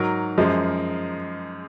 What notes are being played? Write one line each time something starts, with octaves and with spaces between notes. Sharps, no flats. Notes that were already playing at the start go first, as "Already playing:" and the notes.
Already playing: G#2 F#3 A#4
F#2 F3 G#3